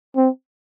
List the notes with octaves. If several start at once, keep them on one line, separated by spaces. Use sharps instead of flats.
C4